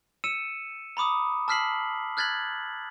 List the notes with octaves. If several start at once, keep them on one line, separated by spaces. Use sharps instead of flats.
E6 C#7 D#7 E7
A#5 B5 D6 D#6
A5 E6 F6 B6 C7 F#7
F6 F#6 G#6 A6 B6 F#7